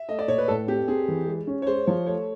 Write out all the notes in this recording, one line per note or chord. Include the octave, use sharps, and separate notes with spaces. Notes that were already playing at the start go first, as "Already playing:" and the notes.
Already playing: E5
A3 D#5
D5
A#2 C#5
B4
A2 A4
C4 G4
C4 G#4
E3
G#3
C#4
C#5
G#3 C5
F3 C#5
A3 C#5